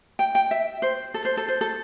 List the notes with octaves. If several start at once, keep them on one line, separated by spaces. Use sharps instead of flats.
G5
G5
E5
C5
A4
C5
A4
C5
A4